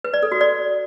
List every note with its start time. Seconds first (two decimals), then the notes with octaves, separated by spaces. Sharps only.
0.04 B4
0.14 D5
0.23 A4
0.32 F#4
0.41 D5